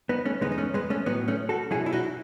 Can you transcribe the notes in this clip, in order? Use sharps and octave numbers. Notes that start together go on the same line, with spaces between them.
B3 D#4
A3 C#4
E2 C#3 G#3 B3 D#4
D#4
A3 C#4
G#3 B3
A3 C#4
A2 F#3 B3 D#4
A3 C#4
F#4 A4
B2 F#3 E4 G#4
E4
D#4 F#4